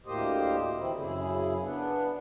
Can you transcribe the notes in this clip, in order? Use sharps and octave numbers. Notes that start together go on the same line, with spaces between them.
D2 A2 A#3 G4 C5 D#5
D3 E3 C4 E4
F#2 C#3 E4 G#4
B3 D4